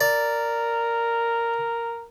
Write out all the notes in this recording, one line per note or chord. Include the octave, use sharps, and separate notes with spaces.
A#4 D5